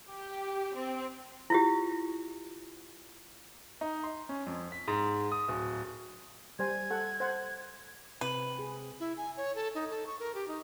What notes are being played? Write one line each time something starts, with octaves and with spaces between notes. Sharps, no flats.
G4
C4
E4 F4 G4
D#4
C6
C#4
F2
B6
G#2
D#6
D1
G3 C5 G#5 G#6
A4 F#5
C5 F#5
C3 C4 B4
G#4
E4
G#5
C#5
A4
D#4
A4
C#6
A#4
G4
D#4